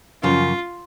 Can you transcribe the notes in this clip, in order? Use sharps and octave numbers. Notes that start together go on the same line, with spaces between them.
F#2 C#3 F3 F4